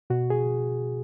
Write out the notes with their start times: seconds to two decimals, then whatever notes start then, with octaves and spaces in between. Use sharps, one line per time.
0.10 B2 F#4
0.30 G#4